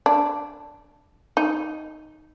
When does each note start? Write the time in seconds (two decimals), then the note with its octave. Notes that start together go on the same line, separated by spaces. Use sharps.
0.06 D4
1.37 D#4